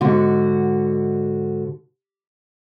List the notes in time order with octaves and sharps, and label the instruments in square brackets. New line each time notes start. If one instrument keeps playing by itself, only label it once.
[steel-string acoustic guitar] G#2 D3 F#4